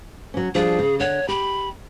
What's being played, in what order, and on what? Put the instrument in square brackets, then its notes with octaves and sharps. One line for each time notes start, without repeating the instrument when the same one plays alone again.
[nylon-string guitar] F#3 C#4
[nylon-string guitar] F3 G3 D4 [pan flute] G#4
[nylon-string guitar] C#3
[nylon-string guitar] D3 F#5 [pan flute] C#5
[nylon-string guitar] G4 [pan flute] B5